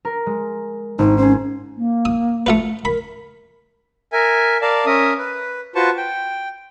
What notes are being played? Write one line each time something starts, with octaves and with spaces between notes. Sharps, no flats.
A#4
G#3
G#1 D#4
C#4 G#4 C5
A#3
D#6
A3 F4 B4
A#4 B5
A#4 E5 G#5
A#4 D5 F5 A5
C#4 A#4 E5 D#6
B4
F4 F#4 B4 C5 A5 C#6
G5